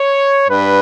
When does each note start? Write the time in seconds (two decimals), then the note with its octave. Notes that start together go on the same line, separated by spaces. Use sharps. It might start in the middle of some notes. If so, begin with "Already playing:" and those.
Already playing: C#5
0.48 G2 B4